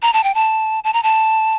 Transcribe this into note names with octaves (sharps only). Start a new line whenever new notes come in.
A#5
A5
G5
A5
A5
A#5
A5